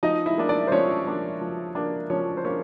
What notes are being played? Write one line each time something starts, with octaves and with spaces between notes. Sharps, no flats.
F3 D#4 D#5
E4 E5
A#3 D4
D4 D5
C5
F3 C#4 C#5
A#3 D4
F3
A#3 D4
F3 C#4 C#5
C5
A#3 C#4 D4 C#5